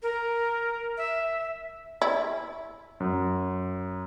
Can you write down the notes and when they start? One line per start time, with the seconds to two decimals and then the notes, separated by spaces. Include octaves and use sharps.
0.02 A#4
0.97 E5
2.02 E4
3.00 F#2